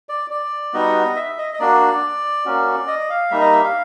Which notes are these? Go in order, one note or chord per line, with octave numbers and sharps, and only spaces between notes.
D5
D5
G3 B3 D#4 F#4 D#5
E5
D#5
D#5
A#3 D4 F#4 D5
A#3 C#4 F#4
D#5
F5
G3 A#3 D#4 E5
D#5
E5
F5